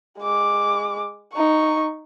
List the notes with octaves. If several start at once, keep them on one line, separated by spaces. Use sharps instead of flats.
G#3 D6
D#4 C#6